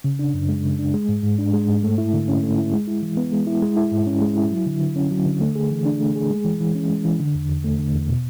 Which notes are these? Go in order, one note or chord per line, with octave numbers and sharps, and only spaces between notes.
C#3
D4
F#2
G#3
C#3
D4
G#3
G#2
G#2
D4
G#3
G#2
A3
E4
D3
C#4
A3
E4
G#3
E4
E3
B3
G#3
E4
G#3
E4
G#2
C#4
G#3
E4
F#3
D3
D3
C#4
F#3
D3
A3
G#4
E3
D4
A3
G#4
G#3
E3
E3
C#4
G#3
E3
D3
E2
E2
A3
D3
E2
B2